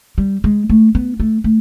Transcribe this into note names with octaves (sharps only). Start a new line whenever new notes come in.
G3
G#3
A3
B3
A3
A3